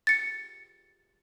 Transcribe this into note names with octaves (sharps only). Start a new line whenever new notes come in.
A6 C#7